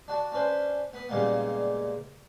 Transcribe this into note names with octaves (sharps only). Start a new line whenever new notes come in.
D4 F#4 A5
C#4 D4 B4 C5
B3 B5 D#6
A#2 C#3 G3 G#3 A#3 B3